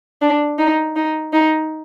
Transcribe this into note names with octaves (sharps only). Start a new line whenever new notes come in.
D4
D#4
D#4
D#4